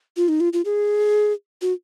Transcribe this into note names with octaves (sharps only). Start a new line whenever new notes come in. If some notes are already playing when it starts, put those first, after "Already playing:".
F4
D#4
F4
F4
G#4
F#4